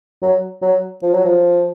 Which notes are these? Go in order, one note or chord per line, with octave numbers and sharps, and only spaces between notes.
F#3
F#3
F3
F#3
F3